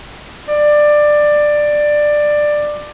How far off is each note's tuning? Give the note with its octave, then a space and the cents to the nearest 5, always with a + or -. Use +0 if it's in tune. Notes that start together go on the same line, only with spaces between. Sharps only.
D5 +15